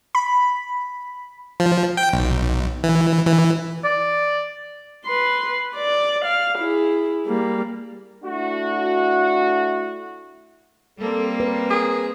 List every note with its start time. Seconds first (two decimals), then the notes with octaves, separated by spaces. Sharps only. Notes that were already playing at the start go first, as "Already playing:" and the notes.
0.15 B5
1.60 F3
1.97 G5
2.13 B1
2.83 E3
3.27 E3
3.85 D5
5.05 B4 C6
5.76 D5
6.25 F5
6.58 E4 G#4
7.26 G3 A#3
8.24 A3 D4 E4 F#4
10.99 G3 A#3 C4 A4
11.40 A#4 B4
11.71 G#4 A#4